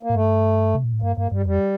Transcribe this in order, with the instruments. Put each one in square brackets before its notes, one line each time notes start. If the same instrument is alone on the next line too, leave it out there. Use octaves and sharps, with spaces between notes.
[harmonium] A#3
[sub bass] A2
[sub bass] G2 [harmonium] A3
[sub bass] C3
A#2
A2
[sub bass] G2 [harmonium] A#3
[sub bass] G2 [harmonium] A#3
[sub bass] G2 [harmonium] G3
[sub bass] F2 [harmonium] G3